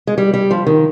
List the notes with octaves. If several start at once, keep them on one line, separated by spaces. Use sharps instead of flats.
G#3
G3
G3
F3
D#3